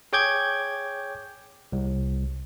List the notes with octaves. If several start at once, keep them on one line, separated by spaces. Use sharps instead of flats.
G#4 C#5 G5 D6 G6 G#6
C2